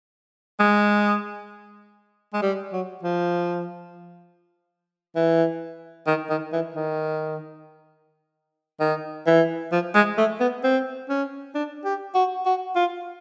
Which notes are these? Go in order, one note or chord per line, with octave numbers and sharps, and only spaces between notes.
G#3
G#3
G3
F#3
F3
E3
D#3
D#3
E3
D#3
D#3
E3
F3
G#3
A3
B3
C4
C#4
D4
G4
F#4
F#4
F4